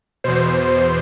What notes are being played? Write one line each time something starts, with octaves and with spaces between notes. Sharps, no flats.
E2 B2 C5